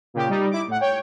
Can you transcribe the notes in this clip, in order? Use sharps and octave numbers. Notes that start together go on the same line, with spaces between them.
A#2 C#3 G4
G3 D#4
E4 D6
A2 F#5
C#5 G5